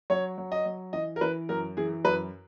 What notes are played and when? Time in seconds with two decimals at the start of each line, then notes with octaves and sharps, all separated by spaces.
0.10 F#3 C#5
0.38 F#3
0.52 D#5
0.65 F#3
0.93 E3 D#5
1.16 A#4
1.21 E3 B4
1.49 F#2 A#4
1.77 E3 G#4
2.04 F#2 B4